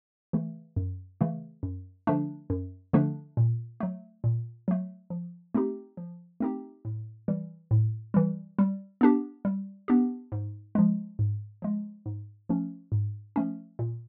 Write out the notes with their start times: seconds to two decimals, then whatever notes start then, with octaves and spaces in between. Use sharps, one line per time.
0.33 C#3 E3 A3
0.76 F#2
1.21 C#3 E3 A3
1.63 F#2
2.07 D3 F3 A3 D4
2.50 F#2
2.93 D3 F3 A3 D4
3.37 A#2
3.80 F#3 A3
4.24 A#2
4.68 F#3 A3
5.10 F3
5.54 A3 C4 D#4 G4
5.97 F3
6.40 A3 C4 D#4 G4
6.85 A2
7.28 E3 G3
7.71 A2
8.14 E3 G3
8.59 G3
9.01 B3 D4 G4
9.45 G3
9.88 B3 D4 G4
10.32 G#2
10.75 F3 G#3
11.19 G#2
11.62 F3 G#3
12.06 G#2
12.49 F3 A3 C#4
12.92 G#2
13.36 F3 A3 C#4
13.79 A#2